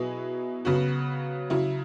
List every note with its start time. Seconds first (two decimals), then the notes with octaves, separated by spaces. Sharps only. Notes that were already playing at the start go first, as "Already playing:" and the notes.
Already playing: B2 F#3 E4 G#4 B4
0.65 C#3 F#3 B3 F#4
1.50 C#3 F#3 E4